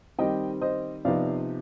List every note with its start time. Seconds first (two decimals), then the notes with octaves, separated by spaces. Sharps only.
0.18 D#3 G3 C4 D#5 G5
0.61 C5 D#5
1.05 C3 F3 B3 D#4 D5 F5